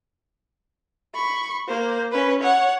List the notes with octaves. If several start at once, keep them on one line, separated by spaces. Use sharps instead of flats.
B5 C#6
A#3 C5
C#4 B4
C#5 F#5